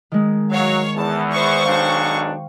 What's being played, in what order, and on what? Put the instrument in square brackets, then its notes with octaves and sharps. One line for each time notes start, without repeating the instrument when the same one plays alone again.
[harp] D#3 G#3
[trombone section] F#3 [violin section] C#5 F5
[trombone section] E2 [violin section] A5
[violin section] C5 C#6
[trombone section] B1 G#2 D4 [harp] F5 G5